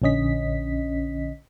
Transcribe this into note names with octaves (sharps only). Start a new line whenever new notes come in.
A#1 D3 C#4 D#5 B6